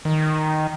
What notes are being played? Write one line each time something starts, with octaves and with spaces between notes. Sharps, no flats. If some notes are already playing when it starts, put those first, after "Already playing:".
D#3